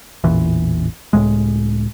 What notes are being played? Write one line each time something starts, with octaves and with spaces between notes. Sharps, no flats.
A1 E2 A#2 E3
C#2 F#2 A2 G#3